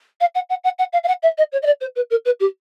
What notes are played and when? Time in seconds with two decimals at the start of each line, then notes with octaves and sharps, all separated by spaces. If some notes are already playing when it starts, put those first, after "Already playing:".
0.20 F5
0.35 F#5
0.49 F#5
0.64 F#5
0.78 F#5
0.93 F5
1.03 F5
1.07 F#5
1.22 E5
1.37 D#5
1.52 C#5
1.62 D#5
1.66 D5
1.80 C5
1.95 B4
2.10 A#4
2.25 B4
2.40 G4